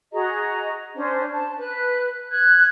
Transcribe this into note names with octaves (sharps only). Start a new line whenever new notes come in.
F#4 G#4 D#5 A#5
C#4 D4 C5
A5
B4 F#6
F#6 G#6